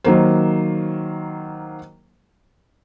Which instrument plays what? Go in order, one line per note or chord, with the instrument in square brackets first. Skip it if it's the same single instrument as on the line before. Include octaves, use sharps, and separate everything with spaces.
[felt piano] D#3 F#3 A#3 C5